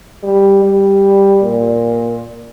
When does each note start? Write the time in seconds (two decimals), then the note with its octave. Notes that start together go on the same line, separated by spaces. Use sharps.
0.23 G3
0.63 G3
1.43 A#2